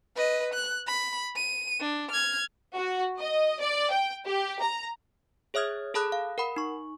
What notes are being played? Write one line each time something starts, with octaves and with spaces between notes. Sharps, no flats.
B4 D#5
F#6
B5
D#7
D4
F6 G#6
F#4
D#5
D5
G5
G4
A#5
G#4 C#5 E5 D#6 F6 G#6
G#4 A4 A5 B5 D#6 F#6
F5
A#4 F#5 B5
D#4 C#6